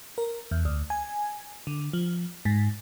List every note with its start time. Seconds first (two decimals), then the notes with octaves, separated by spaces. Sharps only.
0.18 A#4
0.51 E2
0.65 D2
0.90 G#5
1.67 D3
1.93 F3
2.45 G#2